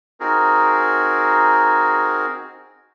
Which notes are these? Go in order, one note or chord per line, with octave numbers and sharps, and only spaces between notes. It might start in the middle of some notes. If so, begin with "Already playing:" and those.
C4 D#4 F#4 G#4 A#4